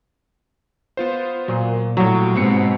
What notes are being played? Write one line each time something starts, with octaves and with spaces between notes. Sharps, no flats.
B3 F4 C5
A#2 F#3
A2 F#3 G3
G#2 B2 C4 F#5 C#7